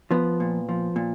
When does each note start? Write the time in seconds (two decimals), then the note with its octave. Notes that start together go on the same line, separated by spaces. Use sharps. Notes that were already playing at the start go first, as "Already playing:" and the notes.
0.11 F3 B3
0.40 A#2
0.69 F3
0.96 A#2